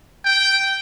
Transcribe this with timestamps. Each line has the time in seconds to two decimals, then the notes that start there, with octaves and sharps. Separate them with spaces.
0.25 G5